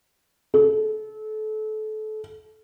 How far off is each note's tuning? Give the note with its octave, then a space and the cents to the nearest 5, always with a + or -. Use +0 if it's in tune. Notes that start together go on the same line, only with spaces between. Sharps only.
A4 -30